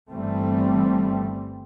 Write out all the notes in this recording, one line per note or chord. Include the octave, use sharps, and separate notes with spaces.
G1 E3 G3 A3 C4